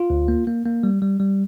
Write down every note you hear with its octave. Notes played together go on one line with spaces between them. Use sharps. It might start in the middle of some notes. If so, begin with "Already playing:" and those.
Already playing: F4
D2
A#3
A#3
A#3
G3
G3
G3